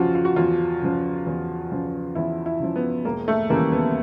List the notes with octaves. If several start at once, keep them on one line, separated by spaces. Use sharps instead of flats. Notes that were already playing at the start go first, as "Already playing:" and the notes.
Already playing: E2 C#3 F3 F4 F#4
F4
F#4
E2 F4
C#3 F3
E2
C#3 F3
E2 E4
E4
C#3 F3
B3
E1 A#3
A3
D#2 C#3 E3 G3 A#3
B3